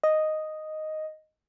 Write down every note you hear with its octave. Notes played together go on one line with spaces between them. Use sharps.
D#5